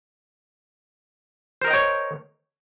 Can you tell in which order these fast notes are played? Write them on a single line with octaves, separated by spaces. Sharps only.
C5 A#4 D#5 G5 C#5